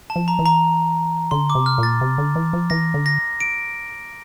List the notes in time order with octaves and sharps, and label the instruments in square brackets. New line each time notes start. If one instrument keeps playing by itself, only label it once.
[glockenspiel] A5
[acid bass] F3
[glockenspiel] A#5
[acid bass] E3
[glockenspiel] A#5
[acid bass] D3 [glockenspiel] C6
[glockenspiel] D6
[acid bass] C3
[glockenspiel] F6
[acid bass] A#2
[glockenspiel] A6
[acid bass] C3
D3
E3
F3
[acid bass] E3 [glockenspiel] A#6
[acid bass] D3
[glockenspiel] A#6
D7